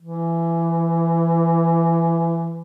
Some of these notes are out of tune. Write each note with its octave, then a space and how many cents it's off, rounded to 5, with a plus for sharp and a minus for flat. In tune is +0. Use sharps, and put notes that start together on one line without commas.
E3 +20